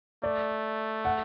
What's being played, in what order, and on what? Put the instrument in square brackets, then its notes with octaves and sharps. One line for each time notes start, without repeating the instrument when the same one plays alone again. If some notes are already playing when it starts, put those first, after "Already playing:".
[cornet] A3 [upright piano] D5
[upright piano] F#5